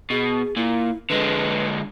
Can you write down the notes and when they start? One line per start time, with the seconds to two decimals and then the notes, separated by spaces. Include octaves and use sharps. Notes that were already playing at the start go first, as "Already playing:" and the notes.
0.10 B2 G#4
0.56 A#2 E4
1.10 D3 G#3 B4